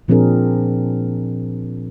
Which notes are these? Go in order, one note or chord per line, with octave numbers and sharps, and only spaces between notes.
A#2 F3 C4 D4 G#4 A#4